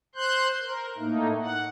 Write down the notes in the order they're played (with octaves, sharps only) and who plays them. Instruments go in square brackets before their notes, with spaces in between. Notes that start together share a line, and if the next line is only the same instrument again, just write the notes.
[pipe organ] C5 C6 F#6 G6
A#4
A2 A3 A#3 D#4
F#5